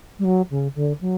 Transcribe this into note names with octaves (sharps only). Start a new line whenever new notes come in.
G3
F#3
C#3
D3
F#3